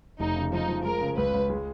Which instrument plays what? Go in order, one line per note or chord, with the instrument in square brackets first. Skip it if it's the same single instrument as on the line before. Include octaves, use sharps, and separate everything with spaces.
[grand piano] F1 [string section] D#4
[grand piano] C#3
[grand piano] F3 [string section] D#4
[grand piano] F3
[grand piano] G#3 [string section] A#4
[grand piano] C#3
[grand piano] C#2 [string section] B4
[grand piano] C#2
G#3